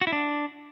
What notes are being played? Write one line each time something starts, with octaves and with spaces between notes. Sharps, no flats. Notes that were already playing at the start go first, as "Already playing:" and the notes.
F#4
E4
D4